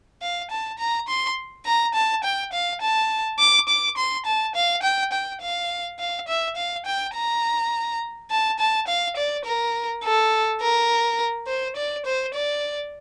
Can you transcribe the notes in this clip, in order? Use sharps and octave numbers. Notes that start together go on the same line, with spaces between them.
F5
A5
A#5
C6
A#5
A5
G5
F5
A5
D6
D6
C6
A5
F5
G5
G5
F5
F5
E5
F5
G5
A#5
A5
A5
F5
D5
A#4
A4
A#4
C5
D5
C5
D5